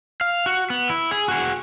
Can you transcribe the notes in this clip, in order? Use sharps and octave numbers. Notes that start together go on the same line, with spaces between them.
F5
F#4
B3
E4
G#4
F#4 G#4